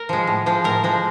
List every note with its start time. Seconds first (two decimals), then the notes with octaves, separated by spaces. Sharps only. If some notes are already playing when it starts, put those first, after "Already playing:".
Already playing: A#4
0.09 F3 G#3
0.27 A2
0.46 F3 G#3
0.64 A2 A#4
0.84 F3 G#3